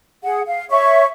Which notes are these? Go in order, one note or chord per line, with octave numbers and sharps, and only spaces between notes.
G#4 F#5
F5
C#5 E5 C#6